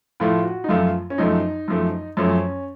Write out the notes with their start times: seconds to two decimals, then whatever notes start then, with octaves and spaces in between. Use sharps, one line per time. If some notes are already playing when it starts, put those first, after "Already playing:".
0.20 A2 F3 A3 F4
0.45 F#4
0.64 D#4
0.69 F#2 F3 A3 F4
1.10 C#4
1.18 F#2 F3 A3 D#4
1.68 F#2 F3 A3
2.17 F#2 F3 A3 C#4